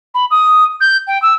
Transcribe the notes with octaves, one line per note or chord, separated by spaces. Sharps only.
B5
D#6
G6
G5
E6